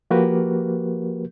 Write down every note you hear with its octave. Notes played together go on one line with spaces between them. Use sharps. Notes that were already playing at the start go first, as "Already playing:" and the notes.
F3 A#3 F#4 G4 A#4 B4